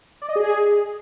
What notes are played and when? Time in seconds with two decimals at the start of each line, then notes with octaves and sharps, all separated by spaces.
0.22 D5
0.29 D#5
0.36 G#4